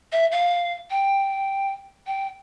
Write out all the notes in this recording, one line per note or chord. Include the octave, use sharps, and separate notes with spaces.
E5
F5
G5
G5